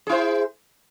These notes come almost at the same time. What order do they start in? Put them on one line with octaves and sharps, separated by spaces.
G#4 E4 C5